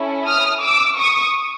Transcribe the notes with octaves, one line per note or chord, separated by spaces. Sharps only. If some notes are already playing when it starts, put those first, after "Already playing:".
Already playing: C#4 E4 A4
D#6 F6
D6 E6
C#6 D#6